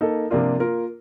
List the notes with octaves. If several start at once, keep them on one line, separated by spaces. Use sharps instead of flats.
A#3 D#4 A4
C3 F3 A#3 D4 F4
A#3 F4 A#4